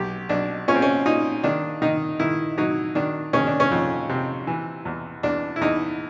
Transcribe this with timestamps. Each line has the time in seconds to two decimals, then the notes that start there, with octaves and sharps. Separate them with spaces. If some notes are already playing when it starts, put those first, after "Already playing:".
Already playing: B1 G4
0.29 B1 D4
0.68 A#2 C#4
0.75 C4
0.82 C#4
1.05 A#2 D#4
1.44 D#3 D4
1.82 D#3 D#4
2.20 D#3 E4
2.58 F#3 D#4
2.95 D#3 D4
3.33 D#3 C#4
3.47 D4
3.60 C#4
3.72 F2
4.09 C3
4.47 E3
4.85 E2
5.23 E2 D4
5.56 E4
5.61 E2 D#4